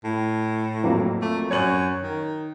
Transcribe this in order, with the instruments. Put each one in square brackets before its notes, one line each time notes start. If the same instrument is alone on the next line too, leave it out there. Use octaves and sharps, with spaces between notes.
[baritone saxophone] A2
[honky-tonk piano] F2 F#3 A#3
[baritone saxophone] A3
[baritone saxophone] F#2 [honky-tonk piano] C#5 F#6 F#7
[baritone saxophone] D#3